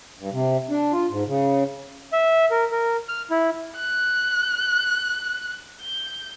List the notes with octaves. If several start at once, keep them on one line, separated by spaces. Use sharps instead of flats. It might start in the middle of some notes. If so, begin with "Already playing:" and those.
G2
C3
D4
F4
G#2
C#3
E5
A#4
A#4
F6
E4
F#6
G6